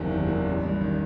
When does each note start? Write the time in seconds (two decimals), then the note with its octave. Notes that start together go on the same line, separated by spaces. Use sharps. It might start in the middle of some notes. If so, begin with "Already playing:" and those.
Already playing: F#1 E2 C3 D#3
0.11 D#3
0.28 E2
0.46 A1
0.63 G2
0.81 D#3